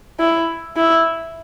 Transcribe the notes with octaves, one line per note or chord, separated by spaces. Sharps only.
E4
E4